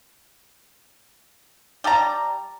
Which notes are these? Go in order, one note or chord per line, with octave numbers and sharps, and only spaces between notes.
G3 G4 A5 A#5